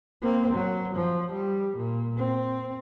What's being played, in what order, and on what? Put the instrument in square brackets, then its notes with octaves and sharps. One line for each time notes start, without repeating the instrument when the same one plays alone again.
[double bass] A#3 C4
F#3
F3
G3
A#2
C4